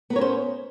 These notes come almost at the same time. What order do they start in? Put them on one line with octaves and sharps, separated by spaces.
B3 A#4 C#5 C#4 C5